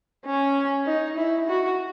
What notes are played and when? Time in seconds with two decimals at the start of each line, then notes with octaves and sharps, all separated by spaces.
0.25 C#4
0.86 D#4
1.17 E4
1.48 F#4